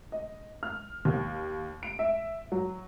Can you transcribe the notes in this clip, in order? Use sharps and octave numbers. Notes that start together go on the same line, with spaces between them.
D#5
F6
D#2
D7
E5
F#3